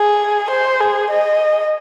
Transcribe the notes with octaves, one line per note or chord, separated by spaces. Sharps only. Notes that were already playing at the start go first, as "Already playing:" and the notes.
Already playing: G#4
C5
G#4
D#5